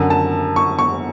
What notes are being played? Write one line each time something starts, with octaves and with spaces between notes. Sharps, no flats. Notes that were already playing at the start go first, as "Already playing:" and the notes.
Already playing: F#2 D3
A5
C#6
C#6